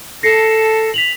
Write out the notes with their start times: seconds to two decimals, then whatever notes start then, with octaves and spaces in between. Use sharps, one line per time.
0.23 A4 A#6 C7 C#7
0.94 B6 F7 F#7